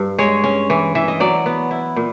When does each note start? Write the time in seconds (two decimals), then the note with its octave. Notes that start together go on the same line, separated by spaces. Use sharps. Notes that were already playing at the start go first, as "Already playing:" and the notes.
Already playing: G2
0.19 G#3 C#5
0.44 C#4
0.70 E3
0.95 E3 E5
1.08 D#5
1.20 F#3 D5
1.46 B3
1.71 E4
1.96 A#2